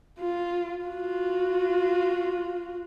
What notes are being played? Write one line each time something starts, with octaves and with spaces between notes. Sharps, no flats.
F4
F4 F#4